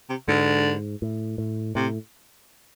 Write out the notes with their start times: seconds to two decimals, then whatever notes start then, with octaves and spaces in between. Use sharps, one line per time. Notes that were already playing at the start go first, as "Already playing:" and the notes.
0.09 C3
0.28 G#2 D3
1.02 A2
1.38 A2
1.75 A2 C3